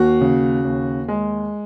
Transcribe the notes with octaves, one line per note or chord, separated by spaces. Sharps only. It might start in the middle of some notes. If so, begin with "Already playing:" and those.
Already playing: D#2 F#4
C#3
D#2
G#3